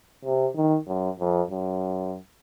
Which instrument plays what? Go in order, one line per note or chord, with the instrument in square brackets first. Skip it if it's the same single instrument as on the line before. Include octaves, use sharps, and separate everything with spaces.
[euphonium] C3
D#3
F#2
F2
F#2